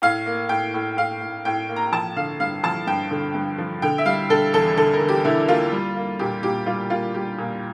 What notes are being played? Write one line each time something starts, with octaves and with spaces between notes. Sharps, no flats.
A2 F5
A#3
A2 G5
A2
A2 F5
A2
A2 G5
A#3
A#5
F3 A5
D3 F5
G2 F5
F3 A5
G2 G5
D3
G2
F3
D3 G5
E5
G3 F5
D3 A4
E2 A4
D3 A4
A#4
D3
G4
D3 E4
A#3 F4
G3
A#3
A#2 G4
A#2 G4
G3 F4
A#3 F4
G3 G4
A#2